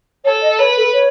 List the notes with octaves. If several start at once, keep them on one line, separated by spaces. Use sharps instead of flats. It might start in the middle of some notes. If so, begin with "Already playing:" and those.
A4 C#5
D#5
B4 C#5
A4
C#5